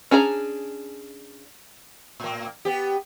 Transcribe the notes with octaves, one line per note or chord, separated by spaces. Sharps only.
C#4 D4 G#4 A#5
A2 A#3
B3 G4